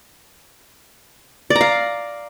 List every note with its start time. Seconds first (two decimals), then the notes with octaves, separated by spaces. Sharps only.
1.50 D5
1.56 A#5
1.61 F5